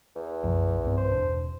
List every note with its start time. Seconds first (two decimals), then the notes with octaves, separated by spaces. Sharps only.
0.16 E2
0.43 B1 F#2 F3
0.83 B1 G2 C4
0.97 C5
1.11 E1 D4